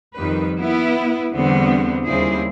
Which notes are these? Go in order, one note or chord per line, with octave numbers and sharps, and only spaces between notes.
F2 D#3 G3 B4
B3 E4 B4
E2 D3 G3 B3 C4
D#2 C#3 G3 C4 E4 G#4